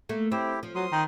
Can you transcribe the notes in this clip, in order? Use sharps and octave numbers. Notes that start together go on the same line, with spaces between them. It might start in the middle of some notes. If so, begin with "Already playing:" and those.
A3 A#3
C4 E4 G4
F3
F#3 C6 D#6
D#3